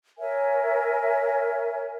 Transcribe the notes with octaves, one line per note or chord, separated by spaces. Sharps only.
A#4 C#5 E5 G#5